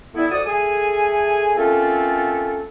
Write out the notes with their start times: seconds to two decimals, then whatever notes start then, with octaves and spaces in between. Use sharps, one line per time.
0.15 G3 A3 B3 E4
0.31 F2 F#4 A4 D5 D#6
0.47 A3 G#4 G#5
1.57 A3 A#3 C4 C#4 F4 A4